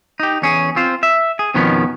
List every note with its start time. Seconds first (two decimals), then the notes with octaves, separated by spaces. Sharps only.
0.20 D#4 G4
0.42 E2 C#4 G#4
0.76 C4 F4 C5
1.03 E5
1.39 G#4
1.54 F2 B2 D#3 F3 B3 C#4